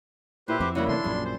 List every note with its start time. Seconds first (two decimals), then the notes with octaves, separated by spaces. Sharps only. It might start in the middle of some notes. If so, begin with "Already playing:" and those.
0.48 A#2 E4 G4 B4 C5
0.60 F2 C4 E4 F#4 D6
0.75 C#3 G3 A#3 E4 F#4 F#5
0.89 C3 E3 A3 D4 C6
1.04 A#1 F#2 A#2 G3 G#4
1.25 C5